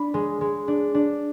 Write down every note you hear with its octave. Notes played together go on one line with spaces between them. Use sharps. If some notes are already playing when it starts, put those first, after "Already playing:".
Already playing: D4 B5
G#3
G#3
D4
D4